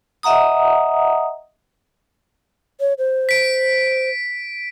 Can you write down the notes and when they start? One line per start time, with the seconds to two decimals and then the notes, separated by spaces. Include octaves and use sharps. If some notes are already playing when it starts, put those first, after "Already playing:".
0.23 D#5 E5 F#5 A#5 D#6
2.80 C#5
2.98 C5
3.29 B6 D7